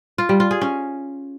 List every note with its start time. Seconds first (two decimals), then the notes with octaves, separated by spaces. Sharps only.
0.18 F4
0.29 G3
0.40 F4
0.51 G#4
0.61 C#4